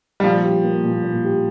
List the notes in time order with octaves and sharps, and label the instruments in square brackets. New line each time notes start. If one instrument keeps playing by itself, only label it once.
[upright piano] G3
[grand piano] A#2 [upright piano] F3
[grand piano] G4
A#3
A#2
A#2
G4